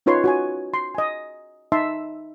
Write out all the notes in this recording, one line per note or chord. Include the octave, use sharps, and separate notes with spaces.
C#4 D#4 F4 B4 C#5 C6
F#4 C#5 G#5
C6
D#5 G#5
D#4 E5 A5 C6